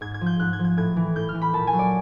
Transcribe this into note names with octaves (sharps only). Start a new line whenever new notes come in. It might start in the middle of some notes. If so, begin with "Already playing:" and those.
G#2 G#6
G#6
F3
G6
G#2 F#6
G#6
F3
G#6
A2 G#6
E3
A2 G6
F6
E3
B5
A#2 A5
G#5
F#3
D5